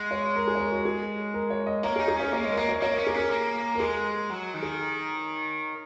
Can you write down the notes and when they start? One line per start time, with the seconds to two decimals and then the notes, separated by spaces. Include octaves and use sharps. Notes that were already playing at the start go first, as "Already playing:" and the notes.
Already playing: G#3
0.11 C#5
0.36 A#4
0.47 G#4
0.55 C#5
0.60 A#4
0.72 F#4
0.85 G#4
1.34 A#4
1.50 C#5
1.67 D#5
1.83 A#3 C#5
1.96 G#4
2.00 D#4
2.08 G#4
2.16 C#4 C#5
2.32 A#3 C#5
2.44 G#3 D#5
2.51 A#4
2.57 A#3 C#5
2.69 C#5
2.82 A#3 C#5
2.94 C#4 A#4
3.07 A#3 G#4
3.14 C#4 A#4
3.31 A#3
3.75 A#4
3.80 G#3 G#4
4.30 F#3
4.54 D#3
4.62 G#4